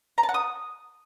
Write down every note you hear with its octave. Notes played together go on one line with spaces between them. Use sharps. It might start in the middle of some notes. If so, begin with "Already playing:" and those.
A#5
A5
F#5
D#6